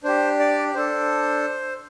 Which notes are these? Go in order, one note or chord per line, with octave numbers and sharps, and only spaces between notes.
D4 G4 C5
D5
D4 A4 C5